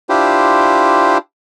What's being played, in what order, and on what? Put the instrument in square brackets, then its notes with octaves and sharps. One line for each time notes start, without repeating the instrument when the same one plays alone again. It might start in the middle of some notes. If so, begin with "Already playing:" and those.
[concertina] D4 E4 F4 G4 C5